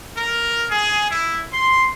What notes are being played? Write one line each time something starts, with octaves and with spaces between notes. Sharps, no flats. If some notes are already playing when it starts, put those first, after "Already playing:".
A#4
G#4
E4
C6